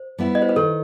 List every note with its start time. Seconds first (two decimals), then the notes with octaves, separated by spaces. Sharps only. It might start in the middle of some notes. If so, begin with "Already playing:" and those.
Already playing: C5
0.18 G3 B3 E4
0.35 D#5
0.42 C5
0.49 B4
0.56 D#3 A4